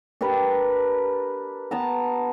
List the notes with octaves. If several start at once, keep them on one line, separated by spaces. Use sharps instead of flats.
D4 G4 A#4 B4
B3 A5 A#5